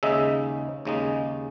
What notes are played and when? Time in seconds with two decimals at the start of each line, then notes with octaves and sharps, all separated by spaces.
0.03 D#2 C#3 G#3 D#4 E5
0.85 D#2 C#3 G#3 D#4